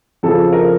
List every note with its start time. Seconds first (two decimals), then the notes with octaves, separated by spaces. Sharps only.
0.23 F2 C#3 F3 A4
0.53 A#4